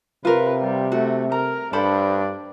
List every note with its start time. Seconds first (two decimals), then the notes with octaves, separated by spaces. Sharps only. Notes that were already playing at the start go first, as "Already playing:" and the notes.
0.25 C3 F4 A#4 B4
0.62 G3
0.92 A3 F#4
1.32 A#4 A#5
1.73 G2 D4 A4 C5 B5